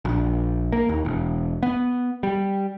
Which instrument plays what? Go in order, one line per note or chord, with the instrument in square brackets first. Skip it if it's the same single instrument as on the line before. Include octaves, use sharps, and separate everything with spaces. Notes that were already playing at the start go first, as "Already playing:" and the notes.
[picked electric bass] A#1
A#3
D#2
E1
B3
G3